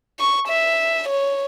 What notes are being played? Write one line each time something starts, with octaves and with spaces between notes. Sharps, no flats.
C#6
E5
C#5